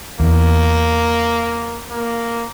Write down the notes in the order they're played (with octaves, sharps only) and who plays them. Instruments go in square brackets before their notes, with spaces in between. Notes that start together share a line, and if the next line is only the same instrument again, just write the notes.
[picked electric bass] E2 [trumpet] A#3
[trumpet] A#3